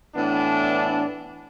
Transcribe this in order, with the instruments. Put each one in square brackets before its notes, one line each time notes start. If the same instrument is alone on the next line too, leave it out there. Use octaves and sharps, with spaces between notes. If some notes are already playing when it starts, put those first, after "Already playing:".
[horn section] A2 E3 B3 D4